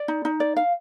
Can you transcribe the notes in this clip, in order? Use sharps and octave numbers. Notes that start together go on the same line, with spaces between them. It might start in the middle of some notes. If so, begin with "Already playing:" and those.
Already playing: D5
D#4
D#4
D5
F5